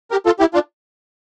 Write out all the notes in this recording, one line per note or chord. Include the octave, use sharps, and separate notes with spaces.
G4 A#4
F4 A4
E4 G4
D4 F4